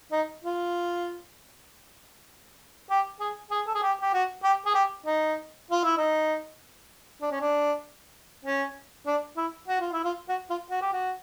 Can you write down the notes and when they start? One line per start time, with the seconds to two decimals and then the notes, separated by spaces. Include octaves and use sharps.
0.12 D#4
0.44 F4
2.90 G4
3.20 G#4
3.51 G#4
3.67 A4
3.74 G#4
3.82 G4
4.01 G4
4.14 F#4
4.43 G4
4.66 G#4
4.74 G4
5.06 D#4
5.71 F4
5.84 E4
5.97 D#4
7.22 D4
7.31 C#4
7.41 D4
8.45 C#4
9.07 D4
9.37 E4
9.68 F#4
9.80 F4
9.93 E4
10.04 F4
10.29 F#4
10.50 F4
10.70 F#4
10.82 G4
10.92 F#4